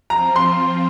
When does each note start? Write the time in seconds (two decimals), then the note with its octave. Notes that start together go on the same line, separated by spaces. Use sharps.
0.10 F3 C4 F4 A#5
0.36 C6